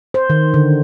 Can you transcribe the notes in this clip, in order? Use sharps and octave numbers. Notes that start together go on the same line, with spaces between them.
C5
D#3
D3